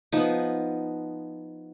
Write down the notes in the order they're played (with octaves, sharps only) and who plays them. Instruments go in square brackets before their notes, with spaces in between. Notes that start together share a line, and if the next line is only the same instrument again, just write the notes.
[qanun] F3 B3 D#4